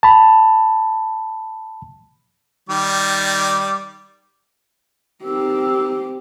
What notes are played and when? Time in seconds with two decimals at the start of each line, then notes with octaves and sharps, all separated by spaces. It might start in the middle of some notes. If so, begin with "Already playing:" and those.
0.03 A5 B5
2.69 D#3 G3 D5
5.24 C4 D#4 G4 A#4 E6